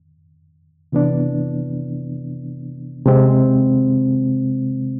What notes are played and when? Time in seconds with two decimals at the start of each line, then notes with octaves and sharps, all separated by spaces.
0.92 C3 E3 B3 D4
3.06 C3 G#3 C4